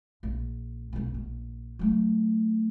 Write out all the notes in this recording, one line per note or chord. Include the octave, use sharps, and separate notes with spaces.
A#1
B1 B3
A#1
F#3 A3